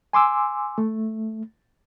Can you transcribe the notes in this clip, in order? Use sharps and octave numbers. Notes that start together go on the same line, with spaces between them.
G#5 C6 D6 E6
A3